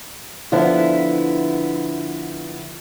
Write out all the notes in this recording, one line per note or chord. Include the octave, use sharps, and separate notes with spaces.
D3 F3 B3 E4